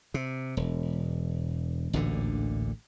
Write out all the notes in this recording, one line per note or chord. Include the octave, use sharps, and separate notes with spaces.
C3
E1
A1 D2 A#2 D3